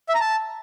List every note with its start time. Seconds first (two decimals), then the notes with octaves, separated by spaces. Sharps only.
0.09 E5
0.15 A#5
0.20 A5